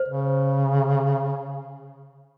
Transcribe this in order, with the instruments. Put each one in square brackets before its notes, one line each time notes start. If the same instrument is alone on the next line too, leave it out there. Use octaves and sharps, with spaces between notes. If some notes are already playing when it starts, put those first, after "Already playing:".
Already playing: [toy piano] C5
[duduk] C#3